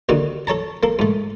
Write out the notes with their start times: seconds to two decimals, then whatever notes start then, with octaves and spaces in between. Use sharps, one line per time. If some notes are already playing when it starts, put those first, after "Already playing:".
0.09 D#2 D3 D#3 F#4
0.47 A4 C#5 A5 A#5
0.83 A#3 A4
0.99 G#2 A3